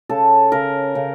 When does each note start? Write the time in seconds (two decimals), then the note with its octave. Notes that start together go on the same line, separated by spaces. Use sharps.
0.09 C#3 A4
0.52 C#3 A#4
0.95 C#3